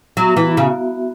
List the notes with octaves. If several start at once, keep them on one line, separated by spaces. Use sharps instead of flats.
F#3 B3 F#4 E5
E3
C#3 B3 F#4 E5